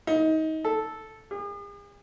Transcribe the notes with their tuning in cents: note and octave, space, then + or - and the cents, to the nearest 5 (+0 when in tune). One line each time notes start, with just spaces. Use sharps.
D#4 +25
A4 -5
G#4 -45